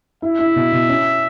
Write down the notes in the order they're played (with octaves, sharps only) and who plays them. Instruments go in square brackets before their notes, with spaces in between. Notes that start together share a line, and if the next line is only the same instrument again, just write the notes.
[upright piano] E4 [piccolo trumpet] E5
[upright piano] E4
B2
B2
C#4